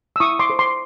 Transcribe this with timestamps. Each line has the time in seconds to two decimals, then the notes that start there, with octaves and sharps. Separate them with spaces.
0.16 E6
0.20 E4 C#6 D#6
0.39 C6 D6
0.50 A4 C5
0.59 C6 D6